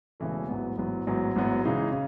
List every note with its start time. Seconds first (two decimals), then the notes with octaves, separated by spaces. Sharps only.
0.20 E1 E2 C#3 E3 A3
0.48 A1 G#2 F#3 B3
0.77 A1 G#2 F#3 B3
1.07 A1 G#2 F#3 B3
1.36 A1 G#2 F#3 B3
1.63 C#3 E3 G#3 D#4 G#4
1.92 C#3